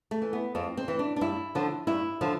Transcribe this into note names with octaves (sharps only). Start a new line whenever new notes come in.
A3
E3
B3
F2 C4
C4
E3
D4
D4
G2 E4
D3 F3
G2 E4
D3 F3